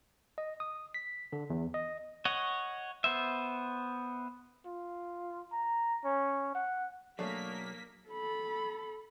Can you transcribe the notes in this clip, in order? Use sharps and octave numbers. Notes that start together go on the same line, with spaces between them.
D#5
D#6
B6
D3
E2
D#5
C#5 D#5 F#5
B3 C5 E5
F4
A#5
C#4
F#5
B1 F#3 A3 A#3 D4 G#4 C#5 B6
A4 B5